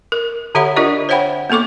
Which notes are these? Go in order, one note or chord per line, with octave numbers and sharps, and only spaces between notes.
A#4
D3 G4 C#5 E5 F#5 B5
D4 F4 G4 A#4 D5 D#5
C5 C#5 E5 F#5 G5 B5
A#3 B3 A4 C#6 D6